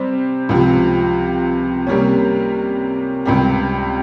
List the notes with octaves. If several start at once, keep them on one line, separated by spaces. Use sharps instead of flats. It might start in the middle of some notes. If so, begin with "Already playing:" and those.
Already playing: C3 G3 C4
C#2 C3 F3
C3 G3 A#3 C#4
C#2 C3 G3